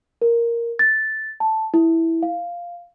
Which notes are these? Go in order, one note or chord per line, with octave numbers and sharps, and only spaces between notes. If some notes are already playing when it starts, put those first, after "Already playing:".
A#4
A6
A5
E4
F5